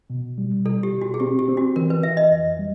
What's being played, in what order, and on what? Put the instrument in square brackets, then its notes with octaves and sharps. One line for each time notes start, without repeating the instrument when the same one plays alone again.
[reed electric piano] B2
G3
[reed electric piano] B2 [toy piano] A4
[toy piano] G4
[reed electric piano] B2
[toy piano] F#4
G#4
[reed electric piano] C4 [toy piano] G4
[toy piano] G4
[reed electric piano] C4
[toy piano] F#4
[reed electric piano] E3 [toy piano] A#4
[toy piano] B4
[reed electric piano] E3 [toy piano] E5
[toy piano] D#5
[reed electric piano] F2
G3